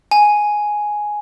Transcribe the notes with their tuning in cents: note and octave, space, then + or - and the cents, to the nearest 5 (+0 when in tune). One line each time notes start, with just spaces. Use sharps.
G#5 +5